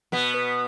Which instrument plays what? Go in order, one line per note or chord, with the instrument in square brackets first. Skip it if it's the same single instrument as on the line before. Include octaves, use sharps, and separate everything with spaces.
[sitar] B2 B3 [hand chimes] F#5
[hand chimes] B4